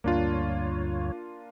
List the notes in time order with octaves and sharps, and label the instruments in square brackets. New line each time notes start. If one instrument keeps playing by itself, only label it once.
[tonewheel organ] D2 G2 C#5 [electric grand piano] A#3 D4 F4